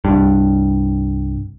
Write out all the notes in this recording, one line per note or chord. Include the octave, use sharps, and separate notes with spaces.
C2 G2